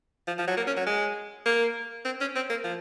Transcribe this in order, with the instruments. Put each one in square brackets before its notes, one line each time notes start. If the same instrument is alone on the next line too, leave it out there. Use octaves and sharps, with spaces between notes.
[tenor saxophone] F3
F3
F#3
A#3
C#4
F#3
G#3
A#3
C4
C#4
C4
A#3
F3